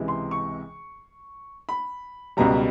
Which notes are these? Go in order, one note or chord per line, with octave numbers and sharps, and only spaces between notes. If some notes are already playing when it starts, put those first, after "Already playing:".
Already playing: C#2 C3 E3 G#3
C6
C#6
B5
C#2 B2 G3 A#5